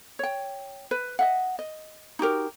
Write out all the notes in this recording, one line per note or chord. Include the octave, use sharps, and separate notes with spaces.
C#5 G5
B4
D#5 E5 F#5
D#5
D#4 F#4 G4 A#4